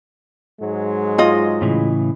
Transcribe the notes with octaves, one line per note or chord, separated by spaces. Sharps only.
G#2 F#3 G#3
F4 D#5
A2 C#3 E3